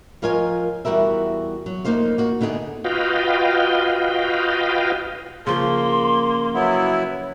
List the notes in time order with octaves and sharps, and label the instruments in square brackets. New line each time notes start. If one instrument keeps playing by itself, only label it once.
[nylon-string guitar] F3 F4 A#4 C#5 D#5 G#5
E2 G3 F#4 A#4 E5
F#3
F2 G#2 A#3 D#4 C5 F5
A#3 F#4
D3 B3 D#4 F4 G#4
[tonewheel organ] F4 F#4 B4 D#5 F5 G5
[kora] C#3 F3 [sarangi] A#3 [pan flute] C6
[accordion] F#3 B3 E4